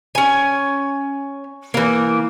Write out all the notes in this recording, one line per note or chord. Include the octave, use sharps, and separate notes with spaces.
C#4 G#5
E3 A#3